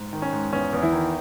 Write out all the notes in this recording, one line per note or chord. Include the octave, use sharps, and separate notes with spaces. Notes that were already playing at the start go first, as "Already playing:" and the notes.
Already playing: G#2
D#3
C#4
G#2
E2 C#4
E2
E3 E4
D#3